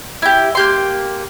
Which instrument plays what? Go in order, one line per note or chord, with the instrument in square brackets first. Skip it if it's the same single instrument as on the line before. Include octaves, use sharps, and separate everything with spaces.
[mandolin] E4 G4
A#3 G4 C6